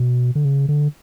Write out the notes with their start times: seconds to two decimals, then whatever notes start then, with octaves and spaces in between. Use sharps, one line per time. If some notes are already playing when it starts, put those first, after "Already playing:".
Already playing: B2
0.35 D3
0.45 C#3
0.69 D3